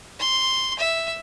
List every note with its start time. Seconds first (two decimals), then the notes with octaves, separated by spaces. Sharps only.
0.19 C6
0.79 E5